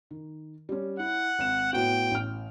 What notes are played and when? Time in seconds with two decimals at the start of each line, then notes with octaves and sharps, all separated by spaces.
0.11 D#3
0.69 G3 C#4
0.99 E4 F#5
1.39 G#1 E7
1.73 A2 B3 F#4 G5
2.11 A1 F6